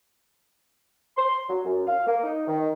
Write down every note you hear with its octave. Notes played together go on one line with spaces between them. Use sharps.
C6
F#3
F#2
F5
A#3
D#4
D#3